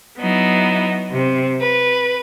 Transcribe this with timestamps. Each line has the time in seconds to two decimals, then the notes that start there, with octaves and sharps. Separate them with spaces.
0.19 F#3 B3 D#4 E4
1.11 C3 C4
1.60 B4